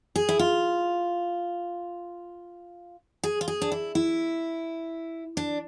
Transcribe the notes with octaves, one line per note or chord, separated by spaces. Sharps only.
G#4
E4
F4
G#4
F4
G#4
D4
E4
E4
D4